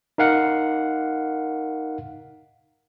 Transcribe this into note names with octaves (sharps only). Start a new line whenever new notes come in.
D#4 A#4 F5 F#5